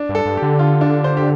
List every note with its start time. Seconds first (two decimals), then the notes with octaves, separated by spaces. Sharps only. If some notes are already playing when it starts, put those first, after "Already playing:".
Already playing: D4
0.09 G2
0.15 A4
0.26 G2
0.37 D3 G4
0.59 F4
0.81 D4
1.04 C5
1.17 G4